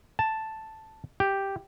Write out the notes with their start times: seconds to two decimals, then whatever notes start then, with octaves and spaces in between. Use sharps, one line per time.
0.19 A5
1.20 G4